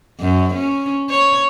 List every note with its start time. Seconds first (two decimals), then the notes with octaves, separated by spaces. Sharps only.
0.20 F#2
0.55 C#4
1.10 C#5